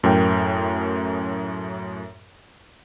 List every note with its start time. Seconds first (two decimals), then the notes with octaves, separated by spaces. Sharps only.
0.04 F#2 A2 A#4 G5